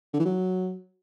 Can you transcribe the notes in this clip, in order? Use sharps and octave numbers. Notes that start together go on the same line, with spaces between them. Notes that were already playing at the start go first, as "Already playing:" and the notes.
D3
E3
F#3